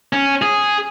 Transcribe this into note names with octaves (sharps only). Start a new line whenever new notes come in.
C#4
G#4